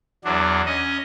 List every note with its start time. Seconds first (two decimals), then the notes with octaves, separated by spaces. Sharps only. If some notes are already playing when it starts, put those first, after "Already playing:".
0.25 E2 F#3 D4
0.66 C#4 D#5